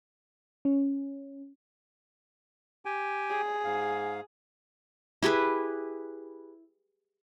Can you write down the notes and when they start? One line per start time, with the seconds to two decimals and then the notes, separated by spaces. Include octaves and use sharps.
0.65 C#4
2.85 G4 G5 G#5
3.30 G#4
3.64 G#2 F5
5.22 E4 G4 G#4 B4